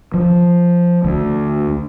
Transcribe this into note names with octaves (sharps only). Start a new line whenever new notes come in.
F3
D2